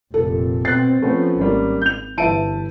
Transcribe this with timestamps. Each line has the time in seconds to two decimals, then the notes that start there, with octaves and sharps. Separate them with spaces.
0.14 F1 A#2 A4
0.65 B2 C4 F#6 A6 C7
1.02 F3 A3 B3 C#4
1.39 G#1 G3 A#3 C#4
1.82 G6 F7
2.18 G1 E3 E5 A5 D7 D#7